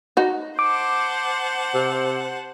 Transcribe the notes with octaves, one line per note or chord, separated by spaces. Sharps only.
D#4 F#4
C5 F#5 A5 D6
C3